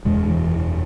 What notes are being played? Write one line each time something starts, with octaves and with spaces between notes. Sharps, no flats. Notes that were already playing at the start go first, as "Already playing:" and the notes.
F#1 E2 B2 G#3
E3